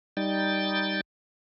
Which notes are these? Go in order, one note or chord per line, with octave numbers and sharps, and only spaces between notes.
G3 D#4 G5 A6